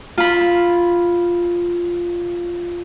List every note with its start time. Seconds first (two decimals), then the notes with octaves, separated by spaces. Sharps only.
0.18 F4 B5